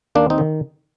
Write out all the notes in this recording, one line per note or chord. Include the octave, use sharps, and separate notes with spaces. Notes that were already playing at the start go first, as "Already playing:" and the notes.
D#2 A#3 D4
C4 D#4
D#3